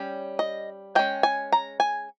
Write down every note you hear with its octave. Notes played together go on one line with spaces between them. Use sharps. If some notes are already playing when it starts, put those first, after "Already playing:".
Already playing: G3 C#4
D#5
G#3 C#4 G5
G#5
A#5
G#5